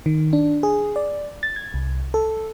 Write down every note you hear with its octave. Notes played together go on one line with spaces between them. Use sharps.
D#3
D4
G#4
D5
A6
G#6
C2
A4